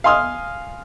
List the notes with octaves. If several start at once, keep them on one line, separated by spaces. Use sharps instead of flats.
F5 G#5 C6 D#6 F6